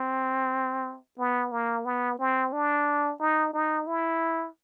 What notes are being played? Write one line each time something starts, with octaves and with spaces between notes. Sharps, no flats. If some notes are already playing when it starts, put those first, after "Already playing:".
Already playing: C4
B3
A#3
B3
C4
D4
D#4
D#4
E4